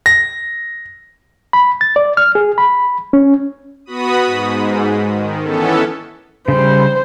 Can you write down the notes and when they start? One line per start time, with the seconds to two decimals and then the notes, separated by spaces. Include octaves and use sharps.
0.06 A#6
1.53 B5
1.81 A6
1.96 D5
2.17 F6
2.35 G#4
2.58 B5
3.13 C#4
3.86 B3 F#4 B5 D#6
4.25 G#2
5.09 D#3
5.43 E3 B3 C#4 A4
6.48 C#3 G3 C5